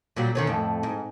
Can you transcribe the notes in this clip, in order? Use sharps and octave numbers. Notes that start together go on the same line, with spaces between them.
A#2 F#3 G3
D3 D#3 C#4
F2 A2
G#2